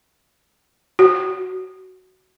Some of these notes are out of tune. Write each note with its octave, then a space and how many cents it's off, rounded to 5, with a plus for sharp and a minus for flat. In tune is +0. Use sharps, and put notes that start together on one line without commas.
F#4 +10